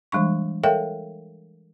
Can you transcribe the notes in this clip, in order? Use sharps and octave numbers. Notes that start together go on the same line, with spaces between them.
E3 G3 G#3 D4 C#6
A4 A#4 C#5 E5 F5 G5